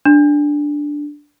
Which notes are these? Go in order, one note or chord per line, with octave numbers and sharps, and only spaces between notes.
D4